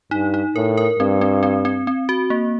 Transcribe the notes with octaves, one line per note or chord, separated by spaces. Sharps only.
G2 D#4
D#4
A2 A#4
A#4
G2 C4
C4
C4
C4
C4
F#4
A#3